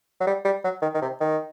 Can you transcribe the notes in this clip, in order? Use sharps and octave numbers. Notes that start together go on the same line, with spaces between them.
F#3
G3
G3
F#3
D#3
D#3
C3
D#3